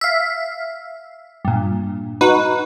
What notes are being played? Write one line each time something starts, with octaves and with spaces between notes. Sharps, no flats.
E5 F5
G2 A#2
D#4 F#4 B4